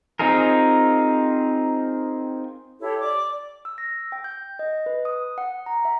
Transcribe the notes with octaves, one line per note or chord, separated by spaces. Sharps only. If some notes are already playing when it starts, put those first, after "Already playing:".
C4 D#4 F4 G#4 A#4
E4 G4 A4 C#5
D5 D6
E6
A#6
G5
G6
D#5
B4
D#6
F#5
A#5
E5